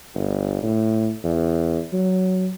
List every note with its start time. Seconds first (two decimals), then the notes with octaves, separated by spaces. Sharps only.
0.15 G1
0.63 A2
1.24 E2
1.93 F#3